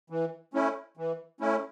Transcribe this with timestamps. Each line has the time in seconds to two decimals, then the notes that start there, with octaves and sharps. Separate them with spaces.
0.10 E3
0.54 A3 C#4 E4
0.97 E3
1.41 A3 C#4 E4